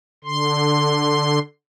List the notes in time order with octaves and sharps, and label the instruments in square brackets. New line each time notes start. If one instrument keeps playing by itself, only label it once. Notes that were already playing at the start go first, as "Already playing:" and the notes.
[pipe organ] D3 C6